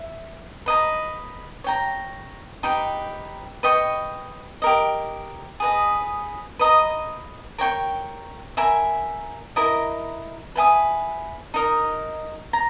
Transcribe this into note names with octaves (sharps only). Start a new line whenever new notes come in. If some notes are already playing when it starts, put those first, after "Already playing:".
Already playing: E5
B4 D#5 A#5
C#5 G5 A#5
D#4 G4 B4 G5
B4 D#5 G5 C#6
G4 A#4 D#5
G#4 B4 D#5
B4 D#5 A#5 D#6
A#4 C#5 G5 C#6
A#4 E5 G#5 B5
E4 A#4 D#5 A#5
B4 E5 G#5 D#6
D#4 A#4 D#5
A#5